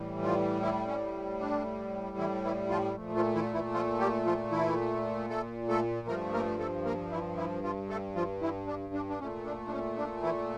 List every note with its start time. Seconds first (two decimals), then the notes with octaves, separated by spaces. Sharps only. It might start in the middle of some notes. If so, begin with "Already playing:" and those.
Already playing: A2 E3 G3
0.23 F3 F4
0.62 E3 E4
0.88 C#4
1.40 D4
2.18 E3 E4
2.44 E3 E4
2.70 F3 F4
2.96 A#2 F3 A3
3.15 F3 F4
3.35 E3 E4
3.54 E3 E4
3.74 F3 F4
4.00 G3 G4
4.26 F3 F4
4.51 E3 E4
5.30 A3 A4
5.69 A3 A4
6.07 G2 F3 A3 A#3 A#4
6.33 A#3 A#4
6.59 A3 A4
6.86 A#3 A#4
7.11 E3 E4
7.37 E3 E4
7.64 F3 F4
7.89 A3 A4
8.16 F3 F4
8.42 E3 E4
8.67 D4
8.93 D4
9.10 D4
9.20 A#2 A3 C#4
9.45 D4
9.67 D4
9.71 C#4
9.97 D4
10.23 E3 E4